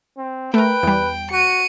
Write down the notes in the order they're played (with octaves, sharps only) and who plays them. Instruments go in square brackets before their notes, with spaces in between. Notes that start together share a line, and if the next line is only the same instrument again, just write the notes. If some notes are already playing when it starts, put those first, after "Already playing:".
[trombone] C4
[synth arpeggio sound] A3 A#4 [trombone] B4 [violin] G5
[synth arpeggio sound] E2 G3
[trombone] F#4 [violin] C#7 D#7